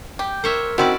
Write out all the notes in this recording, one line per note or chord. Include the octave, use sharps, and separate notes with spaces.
G4
A#4 C5 C#5 E5
D#3 C4 C#4 E4 F#4 D5